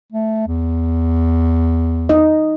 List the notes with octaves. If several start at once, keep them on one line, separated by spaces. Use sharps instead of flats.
A3
E2
D#4 D#5